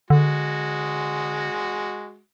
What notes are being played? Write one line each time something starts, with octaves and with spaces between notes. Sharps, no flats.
D3 G#3 F#4